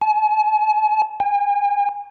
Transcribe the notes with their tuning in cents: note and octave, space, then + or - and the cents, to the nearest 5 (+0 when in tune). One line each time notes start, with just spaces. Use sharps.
G#5 +45
G#5 -40